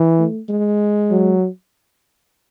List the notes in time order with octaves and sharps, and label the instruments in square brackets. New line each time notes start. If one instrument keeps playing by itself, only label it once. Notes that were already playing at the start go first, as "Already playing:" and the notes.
Already playing: [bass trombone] E3
[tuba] A3
G#3
[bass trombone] F#3